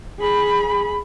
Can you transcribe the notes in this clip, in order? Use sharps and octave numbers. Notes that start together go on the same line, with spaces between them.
G#4 B5